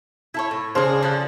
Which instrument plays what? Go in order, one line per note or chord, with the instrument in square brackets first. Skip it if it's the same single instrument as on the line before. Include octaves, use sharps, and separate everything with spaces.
[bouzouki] E4 A4 C#5
A2
[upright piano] C#3 C5 [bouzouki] D4 G#4
[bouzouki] D3 F3 F#5